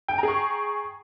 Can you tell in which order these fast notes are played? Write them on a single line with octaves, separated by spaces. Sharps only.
G5 G#5 A#5 G#4 C#6